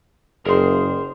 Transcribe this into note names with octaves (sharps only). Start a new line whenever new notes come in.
F#1 G#4 A#4 C5